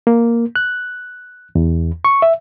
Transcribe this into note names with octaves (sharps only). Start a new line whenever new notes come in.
A#3
F#6
E2
C#6
E5